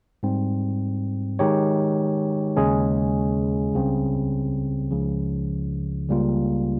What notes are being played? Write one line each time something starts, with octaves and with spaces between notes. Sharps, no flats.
G#2 G3 C4
D#3 G#3 D#4 G4 C#5
D#2 C#3 G#3 C#4 G#4
C#2 C#3 G3 C4
C#2 C#3 F3
C#2 C#3 G3 A#3 F4